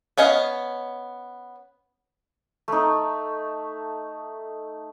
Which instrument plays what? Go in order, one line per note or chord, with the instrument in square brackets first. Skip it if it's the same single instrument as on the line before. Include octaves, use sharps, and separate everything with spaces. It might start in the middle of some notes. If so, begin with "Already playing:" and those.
[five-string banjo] B3 C#4 D#5 F5
[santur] A3 D#4